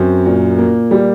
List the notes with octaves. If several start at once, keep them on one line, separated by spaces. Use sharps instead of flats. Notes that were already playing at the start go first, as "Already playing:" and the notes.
Already playing: F#2 C4
A#2
A#3
G3